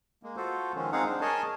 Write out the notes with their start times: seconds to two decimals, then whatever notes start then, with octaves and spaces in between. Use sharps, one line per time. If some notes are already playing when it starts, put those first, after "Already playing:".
0.23 G#3 A#3
0.36 F4 F#4 A4 C5
0.75 D#3 F3 G#3 C#4
0.92 G#3 C4 D#4 G#4 F5 F#5
1.06 D4 C5
1.21 G#4 A#4 C#5 D#5 G#5 A5